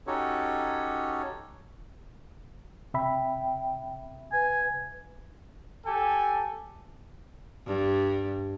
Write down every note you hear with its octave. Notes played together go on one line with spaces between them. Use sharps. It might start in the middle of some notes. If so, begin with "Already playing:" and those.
C#4 D#4 F#4 G4 A4 C#5
C3 E5 G5 B5
B4 G#5
G4 A4 G#5
G2